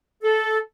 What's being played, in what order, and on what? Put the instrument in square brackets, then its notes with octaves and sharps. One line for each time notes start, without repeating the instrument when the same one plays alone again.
[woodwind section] A4